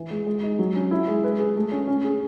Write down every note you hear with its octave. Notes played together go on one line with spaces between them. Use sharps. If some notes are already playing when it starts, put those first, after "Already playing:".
Already playing: E3
G#3
G#3
D#4
F#3
C#4
E4
G#3
B4
G#4
A3
C#4
C#4
G#4